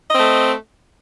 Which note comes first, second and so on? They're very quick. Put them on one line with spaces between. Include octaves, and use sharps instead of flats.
D#5 C4 A3